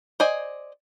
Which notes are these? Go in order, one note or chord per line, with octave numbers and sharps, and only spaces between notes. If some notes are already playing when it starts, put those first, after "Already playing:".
C5 D5 D#5 G#5